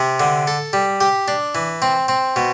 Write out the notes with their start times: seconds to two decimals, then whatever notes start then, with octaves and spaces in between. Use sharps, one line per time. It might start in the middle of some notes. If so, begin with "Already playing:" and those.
Already playing: C3
0.20 D3
0.47 A4
0.73 G3
1.01 G4
1.28 D4
1.55 E3
1.82 C4
2.08 C4
2.36 B2